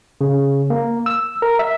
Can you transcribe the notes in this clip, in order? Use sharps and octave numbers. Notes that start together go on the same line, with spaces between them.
C#3
A#3
E6
A#4
E5